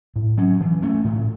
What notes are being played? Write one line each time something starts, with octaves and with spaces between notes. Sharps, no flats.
A2
F#3 C#4
E3
A3 C#4
A2